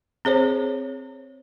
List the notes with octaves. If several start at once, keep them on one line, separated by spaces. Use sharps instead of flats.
C4 G#4 C5 C#5